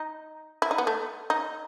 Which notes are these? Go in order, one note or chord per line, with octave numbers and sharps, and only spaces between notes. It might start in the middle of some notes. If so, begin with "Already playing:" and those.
Already playing: D#4
E4
D#4
B3
A3
D#4